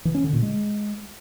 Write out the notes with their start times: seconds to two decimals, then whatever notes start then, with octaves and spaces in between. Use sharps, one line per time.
0.05 E3
0.14 C#4
0.24 D3
0.33 A#2
0.42 G#3